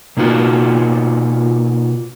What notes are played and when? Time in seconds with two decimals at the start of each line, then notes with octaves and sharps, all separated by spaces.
0.17 B2 A#3 D#4 F4 F#4